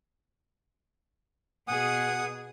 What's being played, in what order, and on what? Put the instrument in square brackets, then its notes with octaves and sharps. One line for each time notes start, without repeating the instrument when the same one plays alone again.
[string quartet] B2 G#4 [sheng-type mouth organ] F#5 D#6